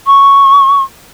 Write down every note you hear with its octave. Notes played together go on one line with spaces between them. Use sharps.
C#6